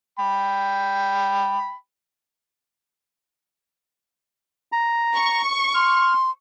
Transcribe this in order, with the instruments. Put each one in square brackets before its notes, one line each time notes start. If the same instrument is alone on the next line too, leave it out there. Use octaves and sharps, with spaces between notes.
[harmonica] G5 B5
[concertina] A#5
[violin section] C#6
[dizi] C6 [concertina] F6